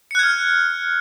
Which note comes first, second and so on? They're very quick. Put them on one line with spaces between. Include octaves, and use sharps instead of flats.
C#7 F#6 G#6 F6